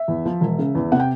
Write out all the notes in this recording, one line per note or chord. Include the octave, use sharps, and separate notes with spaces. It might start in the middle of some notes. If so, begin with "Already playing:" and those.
Already playing: E5
E2
F3
E1
C#3
E2
C3 F#5
G5